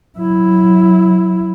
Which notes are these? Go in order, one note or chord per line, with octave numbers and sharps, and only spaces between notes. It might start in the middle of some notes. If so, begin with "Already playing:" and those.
F#3 E4